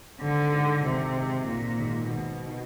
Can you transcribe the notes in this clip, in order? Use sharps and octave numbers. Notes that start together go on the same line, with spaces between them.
G#1 D3
G#2 D#3
G#1 C3
G#2 D#3
G#1 A#2
G#2 D#3
G#1 B2
D#3